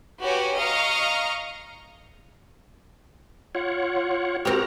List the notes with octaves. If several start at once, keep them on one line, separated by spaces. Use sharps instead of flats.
F#4 G4 B4 C#5 G#5
D#5 F5 A#5 C#6 F6
F4 C#5 F#5
C4 F#4 G4 A#4 A#5